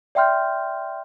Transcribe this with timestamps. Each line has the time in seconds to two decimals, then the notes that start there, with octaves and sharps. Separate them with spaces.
0.15 D5 E5 G5 C6 F6 G6